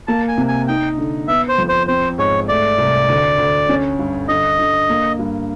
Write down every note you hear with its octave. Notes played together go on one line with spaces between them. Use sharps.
A#3 A5
G#5
C3
G#5
D#4 G5
D3
B3 E5
C5
F2
C5
C4 C5
G#2 C#5
A3 D5
C2
D2
D2
C#4
G2
D3 D#5
D3
A#3
G2